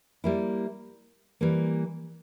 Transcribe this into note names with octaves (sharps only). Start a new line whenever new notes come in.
G3 A#3 E4
E3 G3 A#3